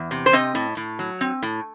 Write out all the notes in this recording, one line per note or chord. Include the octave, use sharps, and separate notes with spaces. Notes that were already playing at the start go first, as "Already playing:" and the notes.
Already playing: E2
C3
C5
C4 D#5
A2
A2
F#3
C4
A2